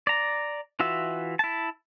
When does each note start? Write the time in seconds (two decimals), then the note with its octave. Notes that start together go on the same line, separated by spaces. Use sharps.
0.07 D5 A#5
0.80 E3 F4 F#4 E5
1.39 E4 A5